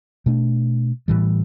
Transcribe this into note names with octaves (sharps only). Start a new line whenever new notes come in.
B2 A3 D4
A2 E3 G3